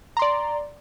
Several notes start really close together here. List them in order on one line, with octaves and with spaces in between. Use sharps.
A#5 C6 D5